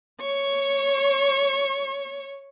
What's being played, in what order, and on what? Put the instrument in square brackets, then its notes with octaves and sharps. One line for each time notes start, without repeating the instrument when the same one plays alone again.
[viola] C#5 C#6